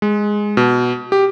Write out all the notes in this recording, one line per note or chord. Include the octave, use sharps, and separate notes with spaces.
G#3
B2
G4